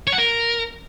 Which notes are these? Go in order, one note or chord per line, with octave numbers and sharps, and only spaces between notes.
C#5
F#5
A#4